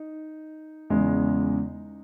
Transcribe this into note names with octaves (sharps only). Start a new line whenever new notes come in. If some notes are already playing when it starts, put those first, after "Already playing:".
Already playing: D#4
E2 C#3 G#3